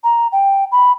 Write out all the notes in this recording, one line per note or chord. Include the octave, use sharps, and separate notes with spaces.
A#5
G5
B5